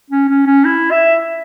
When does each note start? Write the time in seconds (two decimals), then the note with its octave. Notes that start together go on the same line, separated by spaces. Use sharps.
0.11 C#4
0.29 C#4
0.47 C#4
0.65 E4
0.91 E5